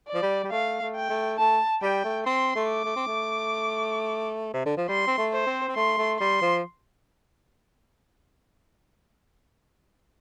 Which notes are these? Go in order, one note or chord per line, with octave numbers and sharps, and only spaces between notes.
D5
F3
G3
G3
A3 F5
A3
G5
A3
A3 A5
G3 G5
A3
C4 C6
A3
D6
A3
C4
A3
C3
D3
F3
G3 C6
C4
A3
C5
C4
C4
A3 C6
A3
G3 C6
F3